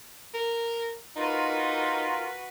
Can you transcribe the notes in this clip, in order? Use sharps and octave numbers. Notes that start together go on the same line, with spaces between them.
A#4
D#4 F4 F#4 A#4 B4